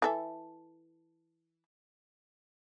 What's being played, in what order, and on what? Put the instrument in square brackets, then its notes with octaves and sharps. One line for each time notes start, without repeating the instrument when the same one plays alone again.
[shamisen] E3 A4 E5